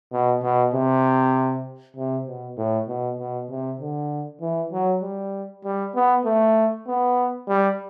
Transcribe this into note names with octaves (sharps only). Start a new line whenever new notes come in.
B2
B2
C3
C3
B2
A2
B2
B2
C3
D3
E3
F#3
G3
G3
B3
A3
B3
G3